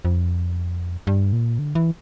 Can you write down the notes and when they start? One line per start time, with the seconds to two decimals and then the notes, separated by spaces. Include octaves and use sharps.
0.05 F2
1.07 G2
1.33 A#2
1.59 D3
1.75 E3